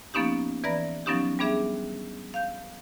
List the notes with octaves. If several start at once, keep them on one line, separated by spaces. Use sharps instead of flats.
F3 A#3 B3 C#4 D#4 G4
E3 B4 D5 A#5 B5 A#6
F3 F#3 B3 C#4 D#4 G4
G3 B3 D4 G#4 E5
F5 G6